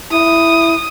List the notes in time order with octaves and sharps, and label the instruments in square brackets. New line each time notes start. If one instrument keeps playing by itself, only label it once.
[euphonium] E4 [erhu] D#6